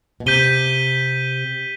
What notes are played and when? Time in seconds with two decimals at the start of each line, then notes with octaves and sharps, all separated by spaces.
0.20 B2
0.26 C3 G6 B6 D#7 G7